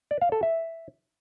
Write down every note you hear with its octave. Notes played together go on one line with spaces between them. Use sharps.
D5
F5
A4
E5